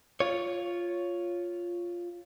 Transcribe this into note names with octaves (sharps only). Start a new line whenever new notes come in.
F4 C#5